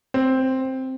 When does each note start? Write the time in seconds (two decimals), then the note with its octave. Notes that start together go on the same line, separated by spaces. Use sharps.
0.14 C4